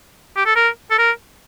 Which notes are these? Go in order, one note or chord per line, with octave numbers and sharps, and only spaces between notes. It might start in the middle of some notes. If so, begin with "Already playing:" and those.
G4
A4
A#4
A4
A#4